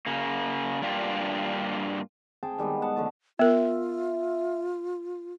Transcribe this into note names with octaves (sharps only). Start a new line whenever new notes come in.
C#3 A#3
G2 A#3 D4 F4 G4
C4 G#4 G5 A5
D#3 G3 G#3 B3
B3 F#5 A5
D3 F3 A3 A5
B3 F4 A#4 E5